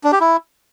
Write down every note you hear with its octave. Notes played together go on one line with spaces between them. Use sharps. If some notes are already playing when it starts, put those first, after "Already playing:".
D4
G4
E4